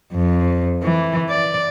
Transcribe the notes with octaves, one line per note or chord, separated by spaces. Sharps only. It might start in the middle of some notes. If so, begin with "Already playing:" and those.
F2
E3
D5